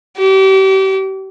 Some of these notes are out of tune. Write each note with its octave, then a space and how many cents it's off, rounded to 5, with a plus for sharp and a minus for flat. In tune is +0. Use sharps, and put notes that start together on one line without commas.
G4 -35